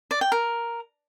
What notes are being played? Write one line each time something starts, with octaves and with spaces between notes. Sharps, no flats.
D5
G5
A#4